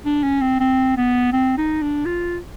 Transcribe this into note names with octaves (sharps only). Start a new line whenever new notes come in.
D4
C#4
C4
C4
B3
C4
D#4
D4
F4